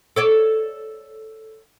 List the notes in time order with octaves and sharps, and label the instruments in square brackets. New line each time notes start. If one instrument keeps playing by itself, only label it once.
[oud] A4 C#5 D5